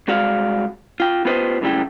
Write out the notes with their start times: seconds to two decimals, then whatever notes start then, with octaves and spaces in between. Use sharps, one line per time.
0.08 C2 G#3 F#4 D5 F5
1.00 F4 G5
1.25 B3 F4 G4 B4 C5 D#5
1.61 F#2 A2 C#3 G3 E4 G5